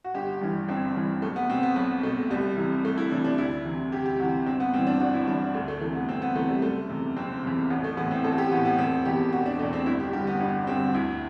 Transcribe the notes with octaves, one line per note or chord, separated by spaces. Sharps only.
F#4
G1 G4
G2 E3
G1 C4
G2 E3
B1 A3
B3
B2 C4
B3
B1 B3
B2 A3
C2 G3
C3 E3
C2 A3
E4
C3 E3 D4
D4
D2 E4
C3 E3
D2 G4
G4
C3 E3 F#4
G1 C4
B3
G2 E3 C4
D4
G1 F#4
E4
G2 E3 D4
D2 A3
A3
C3 E3 A3
B3
D2 C4
B3
C3 E3 A3
G3
F#1 A3
E2 C3
F#1 C4
E2 C3
A1 B3
A3
A2 E3 B3
C4
A1 A4
F#4
G4
A2 E3 B3
B3
E1 C4
E2 B2 G4
E1 F#4
D4
E2 B2 A3
C4
G1 E4
G4
G2 D3 G4
B3
G1 B3
G2 D3 C4
F#4
D2 E4